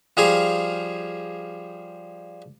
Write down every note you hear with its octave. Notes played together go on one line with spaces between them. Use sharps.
F3 G3 G#4 F5 G#5